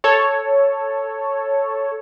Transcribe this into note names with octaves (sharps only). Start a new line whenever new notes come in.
A4 C#5